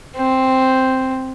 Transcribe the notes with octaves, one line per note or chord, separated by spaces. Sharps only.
C4